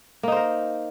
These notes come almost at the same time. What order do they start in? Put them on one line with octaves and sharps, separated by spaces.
A#3 D#4 C5 A#4